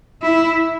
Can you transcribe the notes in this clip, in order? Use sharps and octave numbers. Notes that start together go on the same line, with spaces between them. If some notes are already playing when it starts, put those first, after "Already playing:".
E4